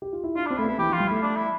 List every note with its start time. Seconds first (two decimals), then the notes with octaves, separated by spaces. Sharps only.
0.02 G4
0.13 F4
0.24 E4
0.35 D4 F4
0.46 C4 D4
0.58 A3 E4
0.65 B3
0.68 E4
0.78 E3 G4
0.89 F3
0.93 F4
1.00 G3
1.07 A3 E4
1.22 D4
1.36 E4